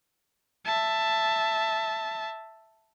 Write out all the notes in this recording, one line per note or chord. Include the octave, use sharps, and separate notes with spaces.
E5 A5